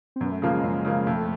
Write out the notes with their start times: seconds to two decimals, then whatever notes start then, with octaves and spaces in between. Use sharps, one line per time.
0.16 C4
0.21 F#2 B3
0.31 A3
0.42 C#3 F3 A3 A#3
0.53 G#3
0.64 F#2
0.85 C#3 F3 A#3
1.06 F2 A3